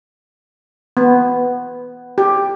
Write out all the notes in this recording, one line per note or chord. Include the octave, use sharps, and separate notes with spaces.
B3
G4